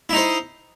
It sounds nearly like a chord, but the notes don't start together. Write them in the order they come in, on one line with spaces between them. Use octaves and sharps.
E4 D#4 C5